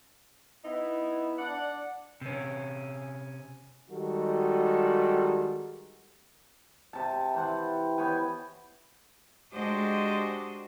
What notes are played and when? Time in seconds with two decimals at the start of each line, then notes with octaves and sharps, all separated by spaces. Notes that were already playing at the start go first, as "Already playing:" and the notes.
0.65 B3 D#4 E4
1.39 D4 D5 F#5
2.21 C3 C#4
3.91 D#3 G3 G#3 F#4 A4
6.93 C3 A5
7.34 E3 C5 F#5
7.98 B3 C#5 G5 G#5
9.53 G#3 D4 F#4 G4 C5 D#5